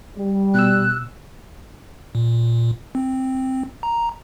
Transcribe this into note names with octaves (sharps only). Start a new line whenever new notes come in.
G3
B2 E6 F#6
A#2
C4
A#5